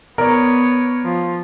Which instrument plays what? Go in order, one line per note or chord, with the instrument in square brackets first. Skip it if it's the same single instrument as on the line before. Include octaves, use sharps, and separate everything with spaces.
[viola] B3 C#5 [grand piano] A#4 D5
[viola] F3